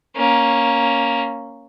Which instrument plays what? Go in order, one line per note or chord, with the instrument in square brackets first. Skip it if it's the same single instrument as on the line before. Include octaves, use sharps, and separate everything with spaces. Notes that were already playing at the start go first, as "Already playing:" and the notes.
[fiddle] A#3 C#4